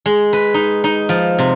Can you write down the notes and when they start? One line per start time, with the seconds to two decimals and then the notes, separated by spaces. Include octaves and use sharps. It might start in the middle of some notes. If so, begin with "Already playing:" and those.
0.06 G#3
0.33 B4
0.54 D#4
0.84 D#4
1.09 F3
1.38 C3